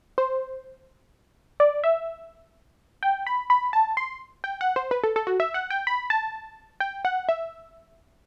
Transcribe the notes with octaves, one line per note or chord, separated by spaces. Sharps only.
C5
D5
E5
G5
B5
B5
A5
C6
G5
F#5
C5
B4
A4
A4
F#4
E5
F#5
G5
B5
A5
G5
F#5
E5